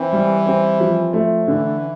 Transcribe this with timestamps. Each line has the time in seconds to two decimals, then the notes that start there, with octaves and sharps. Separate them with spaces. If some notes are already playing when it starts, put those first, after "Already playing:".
Already playing: E3 C4
0.13 G3
0.46 C4
0.80 F3
1.13 A3
1.47 D3 E3